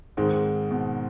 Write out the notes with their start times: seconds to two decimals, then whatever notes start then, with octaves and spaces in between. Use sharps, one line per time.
0.17 G#2 D#3 G#3 C4
0.71 B2